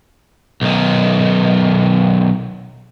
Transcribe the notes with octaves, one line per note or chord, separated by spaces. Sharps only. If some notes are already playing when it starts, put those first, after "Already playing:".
B1 D#3